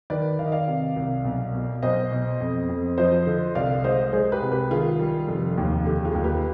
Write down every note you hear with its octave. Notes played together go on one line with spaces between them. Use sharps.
D#3 B4 D5
D#3 F5
D#5
D5 F5
C3
C2
B1
B2
B1 C5 D#5
B2
F2
F2
F3 C5 D#5
D3
C2 D5 F5
G#3 C5 D#5
G#3 G#4 C5
G4 B4
C2
G4 B4
D#3 F4 G#4
G3
F1
D#2
D3 G4
F4 G#4
D#2
G4 B4